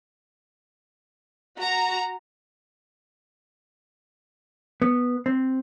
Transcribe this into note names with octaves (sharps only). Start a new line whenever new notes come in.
F#4 A#5
B3
C4